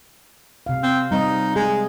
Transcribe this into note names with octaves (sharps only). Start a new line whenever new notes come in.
C3 F5
C4
G3 C4 D#4 D#5
G#3 G#4